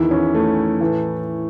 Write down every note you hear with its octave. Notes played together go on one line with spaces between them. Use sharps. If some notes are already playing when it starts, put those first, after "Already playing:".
Already playing: E2 D#3 E4
C#4
A3
A2 E3